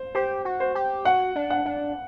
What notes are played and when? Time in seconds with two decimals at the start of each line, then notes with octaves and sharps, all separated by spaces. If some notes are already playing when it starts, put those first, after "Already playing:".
Already playing: C5
0.15 G4 C5
0.45 F#4
0.60 C5
0.75 G4
1.05 F#4 F#5
1.35 D4
1.50 F#5
1.65 D4